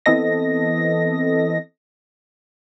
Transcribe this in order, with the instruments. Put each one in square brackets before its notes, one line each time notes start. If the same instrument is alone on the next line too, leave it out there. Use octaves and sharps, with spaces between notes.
[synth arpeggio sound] E3 B3 C4 A4 D#5 A#6